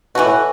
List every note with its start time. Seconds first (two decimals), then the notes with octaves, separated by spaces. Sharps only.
0.15 B2 E3 A3 F#4
0.25 A2